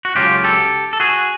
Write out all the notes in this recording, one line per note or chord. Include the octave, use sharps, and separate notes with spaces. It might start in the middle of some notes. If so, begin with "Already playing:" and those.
F#4
C#2 C#3 F#3 F4 G4
G4 A4
A4
F#4 G#4